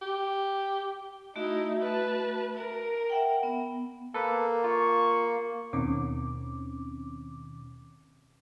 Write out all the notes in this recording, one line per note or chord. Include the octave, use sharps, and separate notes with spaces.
G4
A3 D#4 E4 F#4 E5
B4 A5
A#4
E5 F#5 G5
B3
A#3 A4 B4
F4 C#6
D#2 B2 D#3 C4 C#4 D6